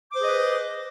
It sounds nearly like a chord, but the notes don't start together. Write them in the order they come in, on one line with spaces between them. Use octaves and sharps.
D6 C5 G#4 D#5 B4